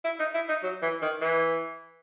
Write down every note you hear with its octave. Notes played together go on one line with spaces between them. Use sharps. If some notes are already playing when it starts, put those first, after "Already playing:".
E4
D#4
E4
D#4
F#3
E3
D#3
E3